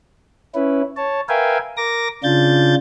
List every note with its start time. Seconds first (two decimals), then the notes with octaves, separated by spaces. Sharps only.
0.55 C#4 E4 B4
0.97 C#5 A5
1.29 A#4 B4 E5 F5 G5 G#5
1.77 A#4 D6 A#6
2.24 C#3 D4 F4 G6 A6